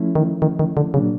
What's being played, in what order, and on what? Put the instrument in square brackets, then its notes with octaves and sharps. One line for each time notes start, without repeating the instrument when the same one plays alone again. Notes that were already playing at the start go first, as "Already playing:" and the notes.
Already playing: [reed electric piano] F3 A3 C#4 E4
[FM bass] D#3
D#3
D#3
D3
[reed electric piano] A#2 F#3 A#3 D4 [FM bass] C#3